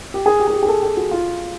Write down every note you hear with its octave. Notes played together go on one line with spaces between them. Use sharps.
G4
G#4
G4
G#4
G4
G#4
A4
G#4
F#4
F4